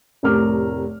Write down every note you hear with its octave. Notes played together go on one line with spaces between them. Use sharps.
F1 A2 C3 A#4 D6 F6